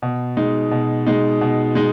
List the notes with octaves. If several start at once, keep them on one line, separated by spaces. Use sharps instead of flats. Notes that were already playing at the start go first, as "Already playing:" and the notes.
B2
G#3 D#4
B2
G#3 D#4
B2
G#3 D#4